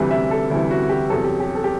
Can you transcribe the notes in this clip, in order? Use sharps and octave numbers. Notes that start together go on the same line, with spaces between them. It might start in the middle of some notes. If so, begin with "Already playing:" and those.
Already playing: D2 C3 E3 G3 B4
E5
A4
D2 C3 E3 G3 E4
F#4
G4
E2 C3 F#3 A4
G4
G4
A4
G4